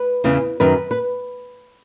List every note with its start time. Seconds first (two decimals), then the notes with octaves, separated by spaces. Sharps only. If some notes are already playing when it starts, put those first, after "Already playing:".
Already playing: B4
0.24 E2 C#3 E3
0.60 F#2 D#3 B4
0.91 B4